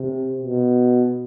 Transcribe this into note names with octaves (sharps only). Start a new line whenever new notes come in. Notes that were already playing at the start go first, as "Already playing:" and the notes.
Already playing: C3
B2